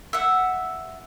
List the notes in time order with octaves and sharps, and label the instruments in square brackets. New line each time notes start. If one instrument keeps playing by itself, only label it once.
[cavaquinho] E5 F#5